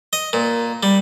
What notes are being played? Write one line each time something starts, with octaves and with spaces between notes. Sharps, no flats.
D#5
A#2
G3